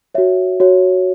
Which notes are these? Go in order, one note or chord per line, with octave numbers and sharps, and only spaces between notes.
F#4 C#5 E5
F#4 C#5